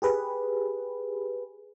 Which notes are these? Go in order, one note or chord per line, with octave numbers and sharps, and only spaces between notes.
G4 G#4 B4